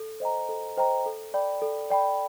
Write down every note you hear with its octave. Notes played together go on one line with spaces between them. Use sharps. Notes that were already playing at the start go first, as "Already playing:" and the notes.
Already playing: A4
C5 D#5 G5 A#5
A4
C5 D#5 G5 A#5
A4
D5 G5 B5
A4
D5 G5 B5